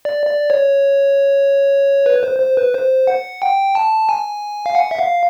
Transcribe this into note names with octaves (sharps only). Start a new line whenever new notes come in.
D5
D5
C#5
B4
C5
C5
B4
C5
F#5
G5
A5
G#5
F5
F#5
E5
F5